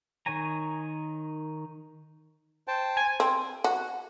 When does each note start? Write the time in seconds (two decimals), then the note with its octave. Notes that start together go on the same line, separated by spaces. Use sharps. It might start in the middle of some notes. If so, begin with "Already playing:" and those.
0.26 D#3 D#4 C#5 G#5 A#5
2.68 C5 G5 A5
2.97 G#5
3.20 C4
3.64 F#4